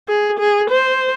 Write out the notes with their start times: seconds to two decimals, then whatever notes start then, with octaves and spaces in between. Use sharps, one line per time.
0.08 G#4
0.40 G#4
0.70 C5